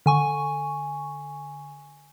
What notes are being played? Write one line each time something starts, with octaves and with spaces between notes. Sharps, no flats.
D3 G#5 C#6